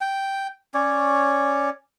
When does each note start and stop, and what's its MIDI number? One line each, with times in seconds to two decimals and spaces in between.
0.01 0.47 79
0.74 1.70 61
0.74 1.70 73
0.74 1.70 74